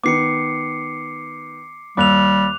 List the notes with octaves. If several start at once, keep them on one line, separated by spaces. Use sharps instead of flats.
D#3 B3 D6 C7 C#7
D#2 G3 D6 E6 F#6 F7